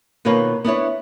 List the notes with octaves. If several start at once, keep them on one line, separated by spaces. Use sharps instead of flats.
B2 D#3 A#3 F4 B4 C#5
B3 D4 E4 C#5